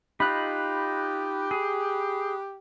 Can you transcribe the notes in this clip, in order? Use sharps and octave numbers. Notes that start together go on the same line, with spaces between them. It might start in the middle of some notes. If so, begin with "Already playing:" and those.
D#4 F4 G4 B5 F#6
G#4